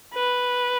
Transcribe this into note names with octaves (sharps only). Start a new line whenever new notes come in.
B4